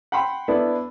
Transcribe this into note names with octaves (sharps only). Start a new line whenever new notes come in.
F#5 G5 B5 C6
B3 D4 E4 A4